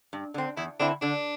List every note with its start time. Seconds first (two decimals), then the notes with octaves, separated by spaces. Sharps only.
0.13 G2
0.34 D3 C4
0.57 E2 E4
0.79 D3 C4 D4 E4
1.02 D3 D4